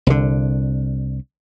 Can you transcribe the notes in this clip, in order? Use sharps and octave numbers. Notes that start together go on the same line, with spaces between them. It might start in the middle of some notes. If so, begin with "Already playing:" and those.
C2 D3